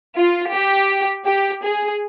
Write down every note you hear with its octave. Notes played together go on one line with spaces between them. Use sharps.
F4
G4
G4
G#4